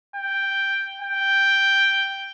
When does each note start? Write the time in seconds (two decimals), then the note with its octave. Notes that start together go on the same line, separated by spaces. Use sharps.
0.16 G5
1.01 G5